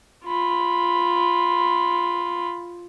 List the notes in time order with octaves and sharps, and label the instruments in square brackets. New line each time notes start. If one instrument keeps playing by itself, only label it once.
[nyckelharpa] F4 B5